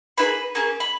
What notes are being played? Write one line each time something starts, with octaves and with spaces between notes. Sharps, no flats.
A#3 E4 G#4 B4 B5
A#3 C#4 G#4
B5